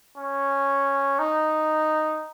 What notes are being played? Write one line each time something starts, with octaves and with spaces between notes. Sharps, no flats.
C#4
D#4